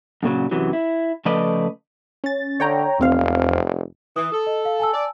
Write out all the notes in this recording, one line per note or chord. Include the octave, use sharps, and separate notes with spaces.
F#2 A#2 C#3 F#3
F#2 C3 E3 F#3
E4
C#3 F3 A3 B4 D5 D#5
C#4 A6
D3 C#5 G5 A#5
F1 E2 C4 F5
E3 D#6
A4
D#5
F5
G#5 A5 E6
D5